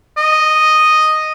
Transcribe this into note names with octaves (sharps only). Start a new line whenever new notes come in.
D#5